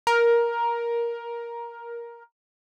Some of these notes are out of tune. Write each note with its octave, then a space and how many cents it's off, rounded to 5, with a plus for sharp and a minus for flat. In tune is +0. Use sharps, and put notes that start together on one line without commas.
A#4 +10